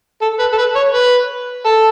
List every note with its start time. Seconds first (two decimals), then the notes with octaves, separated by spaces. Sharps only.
0.22 A4
0.39 B4
0.52 A4
0.58 B4
0.76 C#5
0.94 B4
1.66 A4